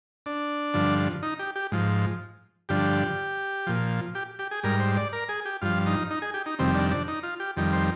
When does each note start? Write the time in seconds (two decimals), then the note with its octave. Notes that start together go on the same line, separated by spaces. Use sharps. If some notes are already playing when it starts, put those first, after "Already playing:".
0.26 D4
0.74 G2 D3 F3
1.23 D#4
1.39 G4
1.56 G4
1.72 G#2 F3
2.69 G2 D3 F3 G4
3.67 A#2 F3
4.15 G4
4.39 G4
4.51 G#4
4.63 G#2 G3 A#4
4.80 C5
4.97 D5
5.13 A#4
5.29 G#4
5.45 G4
5.61 G2 F3 F4
5.86 D#4
6.11 D#4
6.22 G#4
6.34 G4
6.46 D#4
6.59 F2 C3 D#3 G3 C4
6.75 D4
6.91 D4
7.08 D#4
7.23 F4
7.40 G4
7.56 F2 D#3 G3
7.73 C5